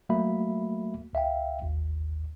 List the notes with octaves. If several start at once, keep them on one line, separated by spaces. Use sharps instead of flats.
F#3 A3 A#3 F#4 E5 B5
C#2 E5 F5 G5
G#1 D#2